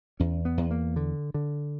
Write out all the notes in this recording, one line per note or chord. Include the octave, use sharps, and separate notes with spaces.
E2 C#4
B3
E2
A#3
D3
D3